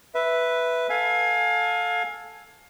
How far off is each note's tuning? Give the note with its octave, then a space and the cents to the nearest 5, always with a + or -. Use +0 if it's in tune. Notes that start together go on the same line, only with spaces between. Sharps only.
B4 +0 E5 +0
A4 +0 F5 +25 G#5 +0